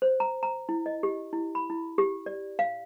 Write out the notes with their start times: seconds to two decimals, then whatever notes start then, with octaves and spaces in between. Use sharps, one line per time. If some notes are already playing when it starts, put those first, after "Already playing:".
0.02 C5
0.20 A#5
0.43 A#5
0.69 E4
0.86 D#5
1.03 G4
1.33 E4
1.55 B5
1.70 E4
1.98 G4
2.26 D5
2.59 F5